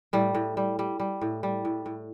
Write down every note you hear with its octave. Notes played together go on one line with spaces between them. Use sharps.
A2 G3
A2
G3
G3
G3
A2
G3
A2
A2